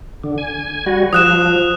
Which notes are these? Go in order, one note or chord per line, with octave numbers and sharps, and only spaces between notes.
D3
G#5
G3 F#4
F3 D#6 F#6 E7